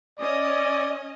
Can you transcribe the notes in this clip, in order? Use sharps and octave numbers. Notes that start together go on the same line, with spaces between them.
C#4 D5 D#5